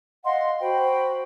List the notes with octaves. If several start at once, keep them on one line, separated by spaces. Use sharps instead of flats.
D#5 F5 F#5 C6
F#4 C5 G5 B5